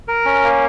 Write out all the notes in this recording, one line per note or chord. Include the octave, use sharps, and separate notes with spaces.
A#4
C#4
A#3